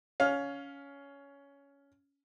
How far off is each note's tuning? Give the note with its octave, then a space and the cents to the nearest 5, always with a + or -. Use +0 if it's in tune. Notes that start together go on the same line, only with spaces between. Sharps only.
C#4 +15 F5 +15